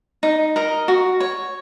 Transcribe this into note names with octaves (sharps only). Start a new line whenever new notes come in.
D#4
A#4 D#5
F#4
C#5